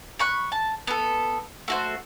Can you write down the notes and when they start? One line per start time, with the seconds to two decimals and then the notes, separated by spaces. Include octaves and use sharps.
0.19 B5 C#6 F#6
0.52 A5
0.87 B3 A4
1.68 A3 F#4 C5